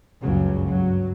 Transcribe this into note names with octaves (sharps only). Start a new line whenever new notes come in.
F#1 C#2 G2 C#3 F#3
G2 F#3